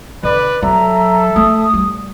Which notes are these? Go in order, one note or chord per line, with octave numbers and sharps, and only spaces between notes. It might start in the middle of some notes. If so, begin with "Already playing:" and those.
D3 B4 D5
F#3 A4 E5 A#5
A3 D#6
G3